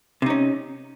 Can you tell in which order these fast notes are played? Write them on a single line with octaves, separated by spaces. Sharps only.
C3 D#4 C#4